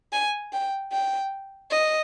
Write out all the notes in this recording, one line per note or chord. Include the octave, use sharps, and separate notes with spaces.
G#5
G5
G5
D#5